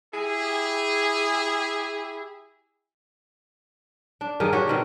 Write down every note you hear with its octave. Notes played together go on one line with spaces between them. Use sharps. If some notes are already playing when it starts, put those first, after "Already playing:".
E4 G4 G#4
D4
G2 D#3 D#4 G#4
D4 F#4 G4 C#5
B2 D#3 C4